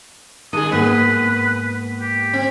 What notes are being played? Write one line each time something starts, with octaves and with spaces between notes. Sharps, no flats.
D#3 G3 G#4 D#6
G#2 A#3 B3 B4
G4
C4